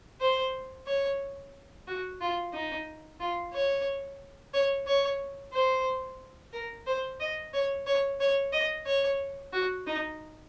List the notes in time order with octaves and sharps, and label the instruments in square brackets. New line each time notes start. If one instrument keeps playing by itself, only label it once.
[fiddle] C5
C#5
F#4
F4
D#4
F4
C#5
C#5
C#5
C5
A#4
C5
D#5
C#5
C#5
C#5
D#5
C#5
F#4
D#4